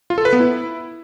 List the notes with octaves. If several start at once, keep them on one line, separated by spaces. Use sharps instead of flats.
F4
A4
B4
B3
E4